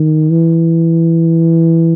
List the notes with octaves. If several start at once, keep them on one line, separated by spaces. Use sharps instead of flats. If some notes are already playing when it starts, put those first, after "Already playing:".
Already playing: D#3
E3